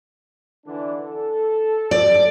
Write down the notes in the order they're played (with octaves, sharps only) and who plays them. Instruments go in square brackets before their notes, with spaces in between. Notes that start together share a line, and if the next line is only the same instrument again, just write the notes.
[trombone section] D3 E3 D4
A4
[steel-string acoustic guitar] D5